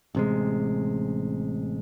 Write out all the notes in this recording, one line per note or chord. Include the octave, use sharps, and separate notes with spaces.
A1 C3 G#3